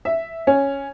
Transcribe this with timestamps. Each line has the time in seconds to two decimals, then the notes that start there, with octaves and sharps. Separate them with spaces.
0.05 E5
0.47 C#4